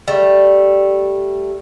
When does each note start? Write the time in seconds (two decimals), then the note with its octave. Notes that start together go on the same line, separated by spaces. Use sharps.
0.08 G3 A3